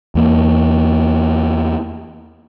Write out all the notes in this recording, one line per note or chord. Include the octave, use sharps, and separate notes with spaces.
E2 A#3